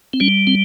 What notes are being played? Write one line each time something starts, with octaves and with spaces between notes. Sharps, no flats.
C4
G3 C#4
C4